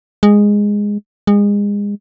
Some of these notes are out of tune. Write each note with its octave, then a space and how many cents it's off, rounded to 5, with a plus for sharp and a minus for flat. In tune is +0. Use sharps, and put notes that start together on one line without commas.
G#3 -10
G#3 -30